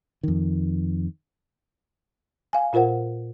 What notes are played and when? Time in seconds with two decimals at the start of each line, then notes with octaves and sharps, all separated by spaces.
0.23 F2 D#3
2.53 F5 G#5
2.73 A#2 F4 A#4 C5 F#5